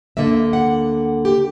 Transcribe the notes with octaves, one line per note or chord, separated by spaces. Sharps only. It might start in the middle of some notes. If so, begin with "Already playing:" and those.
D2 D3 A#3 E5
F#5
G4